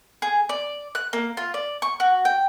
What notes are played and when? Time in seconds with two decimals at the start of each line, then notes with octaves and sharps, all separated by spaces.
0.22 G#4
0.49 D5
0.95 F#6
1.13 A#3
1.37 F4
1.54 D5
1.82 C#6
2.00 F#4
2.25 G5